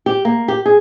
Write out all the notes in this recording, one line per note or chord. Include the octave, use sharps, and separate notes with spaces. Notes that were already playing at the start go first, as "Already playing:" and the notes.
G4
A#3
G4
G#4